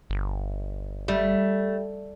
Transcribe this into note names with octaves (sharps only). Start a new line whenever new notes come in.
G1
G3 A3